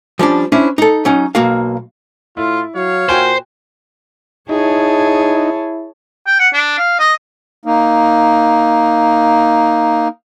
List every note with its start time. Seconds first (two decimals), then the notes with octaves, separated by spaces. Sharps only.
0.19 F3 G3 C#4 D4
0.52 C#4 D4 E4 C5
0.78 D#4 A4
1.05 F#3 C#4 D#4
1.35 B1 A#3 F#4 F5
2.37 A2 E4 F4
2.76 F#3 C#5 F5
3.09 A#2 F#4 C5 G5 G#5
4.49 D#4 E4 G#4 C#5 A5
6.27 G5
6.40 F#5
6.54 D4
6.79 F5
6.99 D#5
7.65 A#3 D#4